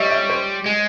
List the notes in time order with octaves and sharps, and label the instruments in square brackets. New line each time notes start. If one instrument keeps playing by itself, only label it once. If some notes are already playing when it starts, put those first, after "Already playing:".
Already playing: [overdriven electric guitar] G3 [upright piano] C#5 D#5 E5
[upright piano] E5
C5
[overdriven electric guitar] G#3